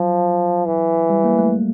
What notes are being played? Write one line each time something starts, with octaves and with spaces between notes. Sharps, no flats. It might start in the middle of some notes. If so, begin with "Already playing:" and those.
Already playing: F3 F#3
E3
G3
A#3
A3